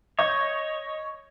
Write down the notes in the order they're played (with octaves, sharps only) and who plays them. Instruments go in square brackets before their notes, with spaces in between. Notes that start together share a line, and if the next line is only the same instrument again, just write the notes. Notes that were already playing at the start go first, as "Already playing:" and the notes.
[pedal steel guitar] C#5 [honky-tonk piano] D#5 G6